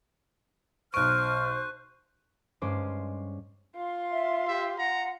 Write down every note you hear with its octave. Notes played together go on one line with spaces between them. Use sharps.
B1 C5 C#6 F6 F#6 D7
G2 G#3 C#4 C5 D6 C7
F4 C6
E5
G4 E5
F#5 A#5